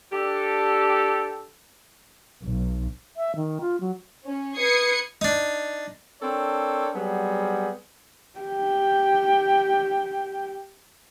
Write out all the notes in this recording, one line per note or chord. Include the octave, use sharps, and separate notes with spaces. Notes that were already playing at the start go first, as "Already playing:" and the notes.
D4 G4 A4
B1
E5
D#3
F4
F#3
C#4
B4 D#6 G#6 C7 C#7
D4 D#4
C4 D4 A4 A#4 C#5
F#3 G3 B3 C4 G#4
G4 G5